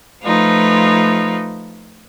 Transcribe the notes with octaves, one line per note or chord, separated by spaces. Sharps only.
F3 A3 D#4 F4 B4